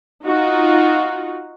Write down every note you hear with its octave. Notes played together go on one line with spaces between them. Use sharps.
D#4 F4 F#4